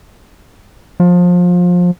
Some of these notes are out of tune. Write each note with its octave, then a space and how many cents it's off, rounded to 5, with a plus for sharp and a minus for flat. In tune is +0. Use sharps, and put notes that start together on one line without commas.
F3 +25